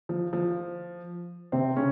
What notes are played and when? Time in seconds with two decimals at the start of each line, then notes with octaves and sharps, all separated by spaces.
0.09 F3
0.33 F3
1.52 C3 C4
1.76 C#3 C#4